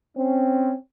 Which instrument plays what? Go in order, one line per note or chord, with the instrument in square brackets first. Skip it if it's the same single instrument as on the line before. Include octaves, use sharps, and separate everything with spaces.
[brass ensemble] C4 C#4